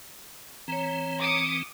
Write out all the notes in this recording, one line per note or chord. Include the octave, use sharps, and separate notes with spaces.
E3 C4 C#5 A#5
D6 D#6 C#7